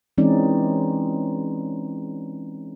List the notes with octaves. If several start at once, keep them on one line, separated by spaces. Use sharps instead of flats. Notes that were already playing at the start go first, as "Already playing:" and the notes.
E3 G#3 C4 C#4 D#4 D5